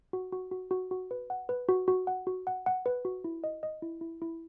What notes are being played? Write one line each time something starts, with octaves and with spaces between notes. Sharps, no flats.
F#4
F#4
F#4
F#4
F#4
B4
F#5
B4
F#4
F#4
F#5
F#4
F#5
F#5
B4
F#4
E4
D#5
D#5
E4
E4
E4